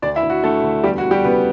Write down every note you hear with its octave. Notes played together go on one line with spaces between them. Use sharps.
D2 D4 D5
E4 E5
D2
F#4
D3 A3 A4
D2
E2 G3 G4
F#4
E2
G3 G4
C#3 B3 B4